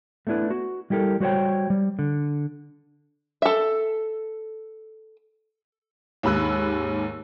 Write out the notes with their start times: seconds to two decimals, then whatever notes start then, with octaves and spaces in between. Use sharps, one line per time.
0.27 A3 B3 D4 E4 B4
0.50 F#4
0.90 G3 E4 G4 A4 A#4
1.20 G3 F#4 C5 C#5 G5
1.70 G3
1.99 D3
3.42 A4 E5
6.23 D#2 G#2 B5 E6 F#6